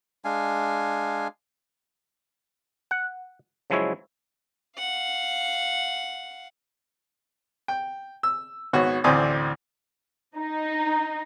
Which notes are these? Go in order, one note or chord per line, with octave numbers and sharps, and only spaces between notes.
G#3 D4 F5 G#5
F#5
C#3 F3 F#3 G#3 E4 C#5
F5 F#5
G5
E6
G#1 B3 F#4 C#5
A1 D2 C4 D5 G#5 D#6
D#4